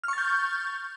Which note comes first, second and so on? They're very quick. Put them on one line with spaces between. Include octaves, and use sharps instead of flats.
F6 C#6 A6 G6